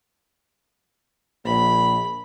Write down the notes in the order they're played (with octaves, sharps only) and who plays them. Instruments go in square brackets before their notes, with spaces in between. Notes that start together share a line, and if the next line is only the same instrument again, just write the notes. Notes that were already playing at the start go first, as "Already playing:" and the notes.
[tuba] A#1 [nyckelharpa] B5